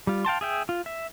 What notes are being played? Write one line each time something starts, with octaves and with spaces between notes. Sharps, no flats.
G3 F4
F5 G5 A5 C6
G#4 E5 G5
F4
E5